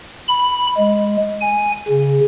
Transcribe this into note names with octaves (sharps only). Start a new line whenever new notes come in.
B5
G#3
G#5
C#3